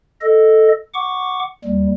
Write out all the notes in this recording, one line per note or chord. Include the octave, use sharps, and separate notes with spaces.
A4 D#5
F#5 C#6 D6
D#2 G3